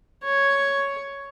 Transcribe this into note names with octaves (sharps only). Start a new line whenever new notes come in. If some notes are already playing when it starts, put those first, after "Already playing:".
C#5